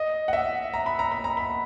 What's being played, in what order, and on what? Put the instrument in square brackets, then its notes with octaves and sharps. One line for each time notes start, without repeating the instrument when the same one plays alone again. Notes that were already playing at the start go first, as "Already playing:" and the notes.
Already playing: [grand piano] D#5
F#5
E5
A#5
B5
A#5
B5
A#5
B5